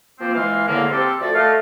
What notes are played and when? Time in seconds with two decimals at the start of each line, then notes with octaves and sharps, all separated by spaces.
0.20 F3 A#3 C4
0.34 E3 G#3 F5
0.67 E2 A2 D3 A#3
0.90 C4 G4 A4
1.19 F3 A3 F#4 A4 D5
1.35 A3 D#5 F5